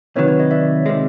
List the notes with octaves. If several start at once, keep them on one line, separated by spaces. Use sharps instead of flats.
C3 D#3 F#3 B4 C#5
B4 C#5
C#5 D#5
D5 E5
C3 D#3 G#3